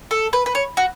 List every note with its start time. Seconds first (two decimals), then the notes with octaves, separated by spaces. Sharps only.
0.11 A4
0.33 B4
0.46 B4
0.55 C#5
0.77 F#4